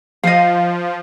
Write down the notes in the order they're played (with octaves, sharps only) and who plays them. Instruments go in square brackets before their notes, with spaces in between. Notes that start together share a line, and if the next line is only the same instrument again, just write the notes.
[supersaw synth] F3 [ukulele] D#5 F5